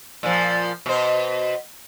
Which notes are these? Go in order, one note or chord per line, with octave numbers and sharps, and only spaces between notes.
A#2 F3
B2 C5